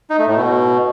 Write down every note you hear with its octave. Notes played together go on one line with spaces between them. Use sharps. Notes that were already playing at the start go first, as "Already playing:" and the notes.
D#4
A3
A2
B2